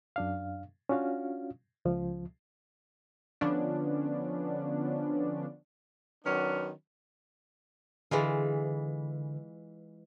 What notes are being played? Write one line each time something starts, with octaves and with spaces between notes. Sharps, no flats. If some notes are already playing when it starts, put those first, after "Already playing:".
F#2 D4 F5
C#4 D4 F4 F#4 F5
C#2 F3
D3 F3 B3 C#4 D4
D#3 F#3 B3 C#4 D4
D3 E3 G#3 F4